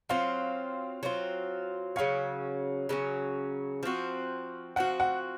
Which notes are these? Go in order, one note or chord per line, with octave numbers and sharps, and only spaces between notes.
F#3 C4 F4 F5
F#3 C4 F4
C#3 F#3 C#4 F5
C#3 F#3 C#4
F3 C4 F#4
F3 C4 F#4 F#5
F#5